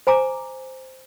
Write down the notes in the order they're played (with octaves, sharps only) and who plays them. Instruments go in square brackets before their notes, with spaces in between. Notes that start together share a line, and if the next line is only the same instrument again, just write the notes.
[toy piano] C5 G#5 A#5 D6